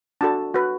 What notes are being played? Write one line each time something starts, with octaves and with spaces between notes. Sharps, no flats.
D4 F#4 A4 A5
F#4 B4